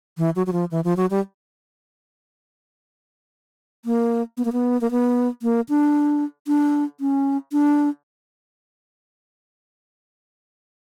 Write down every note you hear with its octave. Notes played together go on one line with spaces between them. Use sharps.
E3
F#3
F#3
F3
E3
F3
F#3
G3
A#3
B3
A#3
B3
A#3
B3
A#3
D4
D4
C#4
D4